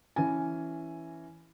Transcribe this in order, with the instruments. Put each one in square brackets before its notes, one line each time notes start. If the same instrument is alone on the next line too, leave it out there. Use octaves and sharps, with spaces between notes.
[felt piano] E3 C#4 G#5